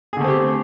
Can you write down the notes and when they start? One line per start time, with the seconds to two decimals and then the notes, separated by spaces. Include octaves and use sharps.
0.13 G#4
0.17 D3
0.20 A3
0.24 C4
0.28 G4